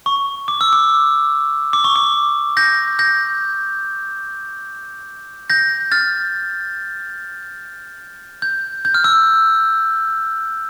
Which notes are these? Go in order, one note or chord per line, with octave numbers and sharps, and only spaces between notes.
C#6
D6
E6
D6
D6
C#6
D6
G6 A#6
G6 A#6
G6 A#6
F6 A6
G6
G6
F6
E6